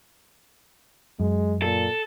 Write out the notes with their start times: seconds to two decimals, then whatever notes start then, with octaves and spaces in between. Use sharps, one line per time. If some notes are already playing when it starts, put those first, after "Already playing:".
1.20 F#2 G#3
1.62 A#2 A4